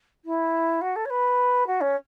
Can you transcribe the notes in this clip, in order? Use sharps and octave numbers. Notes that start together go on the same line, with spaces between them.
E4
F#4
A4
C#5
B4
F#4
C#4